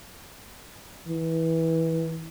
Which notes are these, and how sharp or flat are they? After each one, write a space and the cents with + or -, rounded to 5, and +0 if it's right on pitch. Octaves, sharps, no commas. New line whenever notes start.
E3 -20